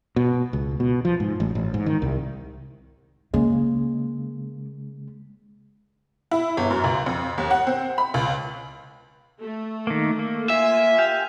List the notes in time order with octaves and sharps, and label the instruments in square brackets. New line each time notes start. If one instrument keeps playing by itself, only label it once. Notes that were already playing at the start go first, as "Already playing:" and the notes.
[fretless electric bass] B2
C#2
B2
F3
G#2
A1
A1
G#2
D#3
C2
[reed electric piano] C#3 G#3 [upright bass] A#3
[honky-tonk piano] E4
G1
F#2
C#2
F2
D#2
F#5
C4
B5
C#2
[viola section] A3
[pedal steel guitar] D#3 A#3
A#3
[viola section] F4 G#5 [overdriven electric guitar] E5
[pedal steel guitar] G4 F5